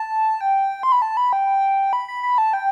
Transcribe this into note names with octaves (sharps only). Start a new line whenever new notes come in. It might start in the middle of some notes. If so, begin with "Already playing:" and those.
Already playing: A5
G5
C6
B5
A5
B5
G5
B5
B5
B5
A5
G5